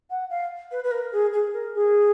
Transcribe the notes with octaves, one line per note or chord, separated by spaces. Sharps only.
F#5
F5
B4
B4
A#4
G#4
G#4
A#4
G#4